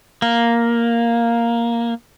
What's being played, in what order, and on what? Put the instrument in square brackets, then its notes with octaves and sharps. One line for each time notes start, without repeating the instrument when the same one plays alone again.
[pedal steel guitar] A#3